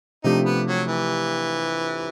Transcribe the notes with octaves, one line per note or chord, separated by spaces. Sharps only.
C3 F3 A3 D4 D#4 G4
B3
F#3
E3